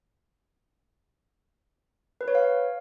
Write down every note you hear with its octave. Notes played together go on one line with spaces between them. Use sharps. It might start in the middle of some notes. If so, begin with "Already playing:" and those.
B4
C#5
F5